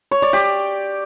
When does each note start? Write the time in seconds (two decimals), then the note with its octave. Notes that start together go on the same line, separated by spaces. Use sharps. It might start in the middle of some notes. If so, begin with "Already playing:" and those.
0.11 C#5
0.22 D5
0.33 G4